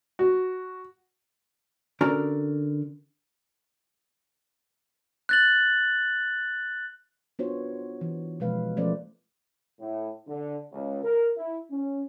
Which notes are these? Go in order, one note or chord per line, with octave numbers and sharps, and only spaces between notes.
F#4
D3 C#4 F#4 A#4 D5 A#5
F#6 A6 F#7
B3 D4 F4 F#4 C5 C#5
E3
B2 F3 G#3 A#3 B4 F5
F3 A3 C#4 A#4 C5 D5
A2
D3
C#2
A#4
E4
C#4